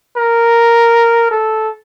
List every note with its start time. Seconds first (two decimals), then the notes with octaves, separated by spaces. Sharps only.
0.17 A#4
1.31 A4